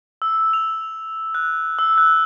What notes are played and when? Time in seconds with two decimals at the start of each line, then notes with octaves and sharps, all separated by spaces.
0.22 E6
0.53 F7
1.35 F#6
1.79 E6
1.98 F#6